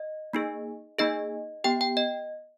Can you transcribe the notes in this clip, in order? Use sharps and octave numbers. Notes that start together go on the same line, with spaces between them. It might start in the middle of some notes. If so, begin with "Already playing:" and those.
Already playing: D#5
A#3 D#4 G#4
A#3 D#4 G#4 D#5
B3 G4 G5
G5
D#5